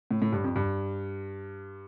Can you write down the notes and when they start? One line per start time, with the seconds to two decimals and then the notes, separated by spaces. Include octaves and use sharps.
0.11 A2
0.22 A2
0.32 G2
0.44 F2
0.56 G2